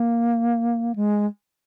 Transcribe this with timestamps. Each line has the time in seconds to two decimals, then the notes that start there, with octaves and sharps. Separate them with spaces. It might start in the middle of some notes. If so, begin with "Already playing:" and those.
Already playing: A#3
0.95 G#3